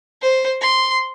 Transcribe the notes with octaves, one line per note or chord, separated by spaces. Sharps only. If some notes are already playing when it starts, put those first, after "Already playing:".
C5
C6